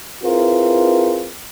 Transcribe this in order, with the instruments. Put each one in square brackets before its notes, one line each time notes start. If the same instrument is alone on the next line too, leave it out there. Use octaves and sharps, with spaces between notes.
[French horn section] C4 E4 F4 G#4 A#4 B4